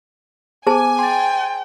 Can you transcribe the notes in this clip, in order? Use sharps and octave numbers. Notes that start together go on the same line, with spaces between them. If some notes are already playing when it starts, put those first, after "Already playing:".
B3 G#4 C5 G#5 A5 D6
G5 C6 A6